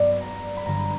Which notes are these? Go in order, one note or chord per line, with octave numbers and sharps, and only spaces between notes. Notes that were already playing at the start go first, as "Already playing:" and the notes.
Already playing: G2 F#3 B3 D5
A#5
B5
G2 D3 G3 A#5